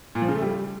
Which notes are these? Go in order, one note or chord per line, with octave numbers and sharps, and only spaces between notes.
A#2
F3
C#3
A3
G3